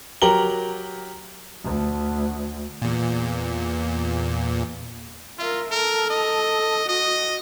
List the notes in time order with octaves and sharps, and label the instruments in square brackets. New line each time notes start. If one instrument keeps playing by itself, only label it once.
[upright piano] F#3 G4 A#4 A#5 F#7 G7
[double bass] D2
[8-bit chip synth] E2 A#2
[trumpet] F4 [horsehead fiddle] A#4 E5
[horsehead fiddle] A4 [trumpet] A#4
[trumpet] D#5
[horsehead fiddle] F#4 [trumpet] D#5